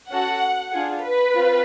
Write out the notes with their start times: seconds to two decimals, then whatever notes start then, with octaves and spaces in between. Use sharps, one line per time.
0.10 C#4 F#4 A4 F#5
0.72 D4 F4 G#4
1.03 B4
1.34 C4 F4